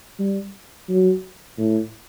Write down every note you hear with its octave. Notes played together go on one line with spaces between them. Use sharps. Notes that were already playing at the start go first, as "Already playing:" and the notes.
G3
F#3
A2